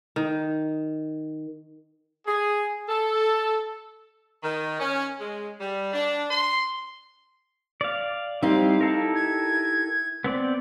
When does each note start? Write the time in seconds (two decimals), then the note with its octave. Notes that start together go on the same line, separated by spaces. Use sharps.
0.16 D#3
2.26 G#4
2.89 A4
4.43 D#3
4.80 C#4
5.20 G#3
5.60 G3
5.93 D4
6.31 C6
7.81 D5 F5
8.43 G3 C4 D#4 E4 G4 F5
8.81 E4 A4 A#4
9.15 G#6
10.24 B3 C4 D5